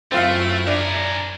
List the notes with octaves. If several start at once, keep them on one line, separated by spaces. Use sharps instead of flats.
F#2 A3 C4 E4 F4 E5 F5
D4 G#4 A#4